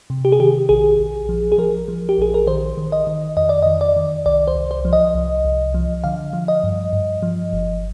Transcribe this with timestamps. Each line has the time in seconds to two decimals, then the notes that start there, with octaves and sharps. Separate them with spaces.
0.10 C3
0.25 G4
0.32 G#4
0.39 D#3 G4
0.69 A#1 G#4
0.99 A#1
1.29 F3
1.52 G#4
1.58 F3 A#4
1.88 F3
2.09 G4
2.18 A#1 G#4
2.34 A#4
2.47 D#3 C5
2.77 D#3
2.92 D#5
3.07 D#3
3.37 F2 D#5
3.49 D5
3.62 D#3 D#5
3.81 D5
3.96 D#3
4.25 C2 D5
4.48 C5
4.55 C2
4.71 C5
4.85 F3
4.93 D#5
5.15 C2
5.45 C2
5.74 F3
6.04 D3 F5
6.33 F3
6.48 D#5
6.64 G2
6.93 G2
7.23 F3
7.53 G1